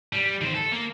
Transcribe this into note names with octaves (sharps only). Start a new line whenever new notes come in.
G3
D#3 C5
A4
A#3